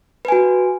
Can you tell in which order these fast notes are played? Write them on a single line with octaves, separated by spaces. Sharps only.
B4 G#5 F#4